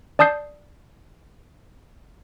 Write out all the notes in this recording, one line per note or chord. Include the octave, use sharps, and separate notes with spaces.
D5 A5 D#6 G6 C7